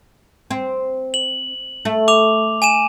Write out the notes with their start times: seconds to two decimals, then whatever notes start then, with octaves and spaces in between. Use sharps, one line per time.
0.51 C4
1.14 F#7
1.85 A3
2.08 D6 F7
2.62 G#5 D#7 E7